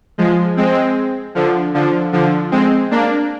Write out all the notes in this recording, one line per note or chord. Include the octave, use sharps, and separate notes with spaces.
F3 G#3
G#3 C4
D3 F3
D3 F3
D3 F3
G#3 C4
A#3 D4